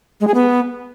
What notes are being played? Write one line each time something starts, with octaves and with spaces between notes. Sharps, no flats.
G#3
G#4
B3